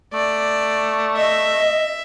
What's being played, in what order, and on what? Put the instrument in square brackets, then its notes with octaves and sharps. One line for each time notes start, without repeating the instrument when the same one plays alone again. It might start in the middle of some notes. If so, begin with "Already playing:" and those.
[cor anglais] A3 [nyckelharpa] D5
[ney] D#5 [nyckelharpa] E5